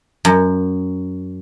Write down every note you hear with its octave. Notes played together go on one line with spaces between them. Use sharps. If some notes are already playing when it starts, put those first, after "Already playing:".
F#2